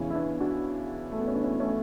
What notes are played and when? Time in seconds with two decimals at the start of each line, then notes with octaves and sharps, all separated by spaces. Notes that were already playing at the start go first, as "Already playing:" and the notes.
Already playing: E2 C#3 E3 C#4 E4
0.10 E4
0.15 B3 D4
0.40 D4 F#4
1.12 A3
1.20 B3
1.28 C#4
1.35 D4
1.43 C#4 E4
1.60 A3 C#4